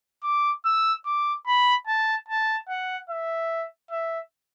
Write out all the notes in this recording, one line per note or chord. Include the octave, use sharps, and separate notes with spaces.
D6
E6
D6
B5
A5
A5
F#5
E5
E5